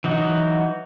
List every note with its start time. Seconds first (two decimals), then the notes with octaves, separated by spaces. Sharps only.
0.04 E3 F#3 D#4 F#4